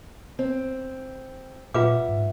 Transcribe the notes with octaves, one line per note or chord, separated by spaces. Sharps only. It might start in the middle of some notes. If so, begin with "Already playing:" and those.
C4
A#2 F4 B4 E5 F#5 D6
G#2